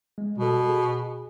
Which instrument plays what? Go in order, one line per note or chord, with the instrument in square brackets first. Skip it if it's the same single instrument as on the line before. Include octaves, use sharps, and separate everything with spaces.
[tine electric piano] G#3
[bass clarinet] B2 [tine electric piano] G3 A4
[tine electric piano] G#4